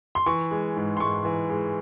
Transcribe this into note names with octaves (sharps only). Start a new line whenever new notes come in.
C6
E3 C#6
G#3
G#2
C6
G#2 C#6
E3
G#3